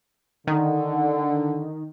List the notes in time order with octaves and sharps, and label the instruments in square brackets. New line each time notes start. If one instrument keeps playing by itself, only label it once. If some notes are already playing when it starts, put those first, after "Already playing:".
[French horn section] D3 [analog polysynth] D#3